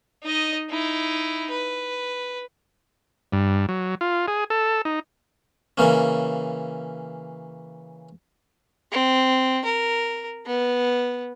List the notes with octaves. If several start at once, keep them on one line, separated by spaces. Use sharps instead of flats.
D#4 D#5
D#4 E4
B4
G2
F#3
F4
G#4
A4
D#4
C#3 E3 A#3 C#4
C4
A#4
B3